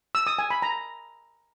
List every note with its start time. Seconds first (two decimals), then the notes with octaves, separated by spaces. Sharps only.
0.15 E6
0.27 D#6
0.39 G#5
0.50 B5
0.62 A#5